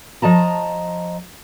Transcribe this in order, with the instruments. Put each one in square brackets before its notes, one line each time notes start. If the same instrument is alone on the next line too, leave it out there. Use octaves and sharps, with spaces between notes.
[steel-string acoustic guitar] F3 D#5 A5 A#5